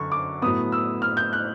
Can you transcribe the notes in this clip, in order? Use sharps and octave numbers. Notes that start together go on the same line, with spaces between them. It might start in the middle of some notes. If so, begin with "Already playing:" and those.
Already playing: F#2 D3 C#6
D6
A2 F#3 B3 D#6
E6
F6
G6
F#6